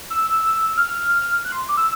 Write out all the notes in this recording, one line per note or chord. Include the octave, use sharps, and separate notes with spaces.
E6
F6
F#6
C6
D6
E6